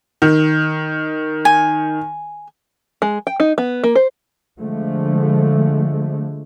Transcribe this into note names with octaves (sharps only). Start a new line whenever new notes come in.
D#3
G#5
G#3
G5
D#4
B3
A#3
C5
D3 F3 G#3 A3